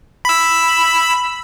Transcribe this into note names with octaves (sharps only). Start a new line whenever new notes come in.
B5 E6